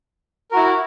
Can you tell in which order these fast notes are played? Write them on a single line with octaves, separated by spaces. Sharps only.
A#4 F#4 E4